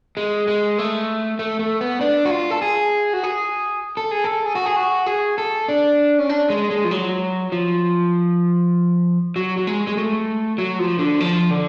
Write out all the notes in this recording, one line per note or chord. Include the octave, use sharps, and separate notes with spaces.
G#3
G#3
A3
A3
A3
B3
D4
F#4
F4
A4
G#4
F#4
G#4
A4
G#4
A4
G#4
F#4
G#4
F#4
G#4
A4
D4
C#4
D4
G#3
G#3
F3
F#3
F3
F#3
F#3
G#3
G#3
A3
F#3
F3
D3
F3
D3